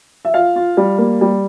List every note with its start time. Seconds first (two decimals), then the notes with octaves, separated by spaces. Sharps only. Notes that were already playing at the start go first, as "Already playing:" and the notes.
0.25 E5
0.34 F4 F5
0.56 F4
0.77 G3
0.98 A#3
1.21 G3